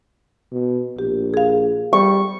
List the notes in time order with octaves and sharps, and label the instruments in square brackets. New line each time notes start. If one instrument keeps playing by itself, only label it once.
[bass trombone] B2
[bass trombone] A#1 [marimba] G4
[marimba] G#4 F5
[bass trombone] G3 [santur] C#6